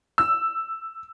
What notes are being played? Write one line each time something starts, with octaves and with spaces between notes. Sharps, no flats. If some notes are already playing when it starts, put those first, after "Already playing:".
E6